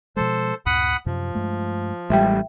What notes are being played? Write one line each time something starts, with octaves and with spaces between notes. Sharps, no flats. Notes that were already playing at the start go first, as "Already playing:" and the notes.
B2 F3 G#3 A4 C5
C#2 F#2 A2 F#5 B5 D#6
F#2 C3 F3
G2 G#3 A3
A1 G3 G#3 E5 G5